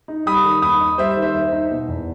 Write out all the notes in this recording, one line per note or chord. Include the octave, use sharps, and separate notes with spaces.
D#4
G3 B5 D#6
D#3
D#2 B5 D#6
D#4
G3 C5 E5
D#3
C5 E5
D#2
D#4
B2
E2